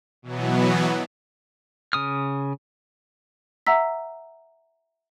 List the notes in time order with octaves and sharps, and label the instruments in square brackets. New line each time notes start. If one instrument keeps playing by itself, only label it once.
[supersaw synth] B2 E3 F#3 B3
[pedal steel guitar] C#3 D#6 F6
[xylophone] E5 F#5 A#5 E6 B6